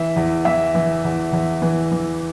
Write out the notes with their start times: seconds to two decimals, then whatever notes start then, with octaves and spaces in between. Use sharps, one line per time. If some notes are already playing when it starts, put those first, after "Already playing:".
Already playing: E3 E5
0.16 E2
0.45 E3 E5
0.75 E3
1.04 E2
1.33 E2
1.62 E3
1.92 E3